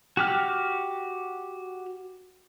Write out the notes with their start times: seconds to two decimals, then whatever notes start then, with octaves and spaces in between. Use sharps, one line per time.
0.17 F#4 G4 F6